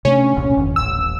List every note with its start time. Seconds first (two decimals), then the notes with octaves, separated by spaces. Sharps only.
0.05 C3 A3 C#4 D4
0.36 E1 C2 A#2
0.57 G1 F2 D#3
0.76 D#1 A1 E6